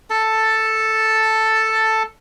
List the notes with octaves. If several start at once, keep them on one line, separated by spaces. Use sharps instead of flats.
A4 A5